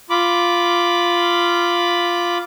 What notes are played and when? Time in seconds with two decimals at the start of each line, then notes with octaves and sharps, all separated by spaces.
0.10 F4 B5 D6